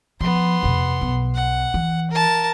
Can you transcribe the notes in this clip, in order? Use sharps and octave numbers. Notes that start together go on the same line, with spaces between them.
F3 B3 C6
F2 C3
B1
F#5
E3
A#4 A5